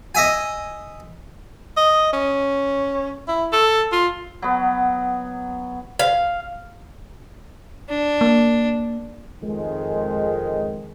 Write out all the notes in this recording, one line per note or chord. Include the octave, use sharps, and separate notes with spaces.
D#5 E5 G#5
D#5
C#4
E4
A4
F4
F#3 B3
F5
D4
A#3
F2 D#3 G#3